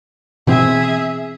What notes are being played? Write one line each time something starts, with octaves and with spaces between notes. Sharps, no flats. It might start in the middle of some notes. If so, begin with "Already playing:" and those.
B2 E3 C4 G#4 E5